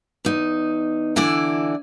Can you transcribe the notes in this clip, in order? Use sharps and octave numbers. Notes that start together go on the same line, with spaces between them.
E2 D#4
D3 E3 E4 D5